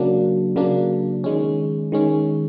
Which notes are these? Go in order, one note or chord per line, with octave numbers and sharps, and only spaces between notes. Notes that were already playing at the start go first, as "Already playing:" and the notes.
Already playing: C#3 F#3 A#3 D4
C#3 F#3 A#3 D4
D#3 G#3 C#4
D#3 G#3 C#4